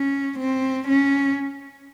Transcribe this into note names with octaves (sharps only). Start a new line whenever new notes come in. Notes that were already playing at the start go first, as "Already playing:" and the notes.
Already playing: C#4
C4
C#4